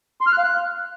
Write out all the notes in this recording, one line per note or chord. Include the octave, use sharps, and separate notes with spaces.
C6
F6
F#6
F5
F#6